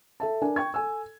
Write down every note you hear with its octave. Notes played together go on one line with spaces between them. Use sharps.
A4 E5 A5
D4 A#4 G#5
G5 C#6 G#6
A4 G#5 E6